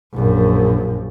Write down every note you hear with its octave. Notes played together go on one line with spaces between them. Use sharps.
A#1 F#2